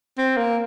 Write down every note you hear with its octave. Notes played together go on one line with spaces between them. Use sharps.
C4
A#3